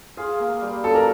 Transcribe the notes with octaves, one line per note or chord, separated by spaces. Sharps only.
F4 G#4
A#3
G3
F#2 A4
A#4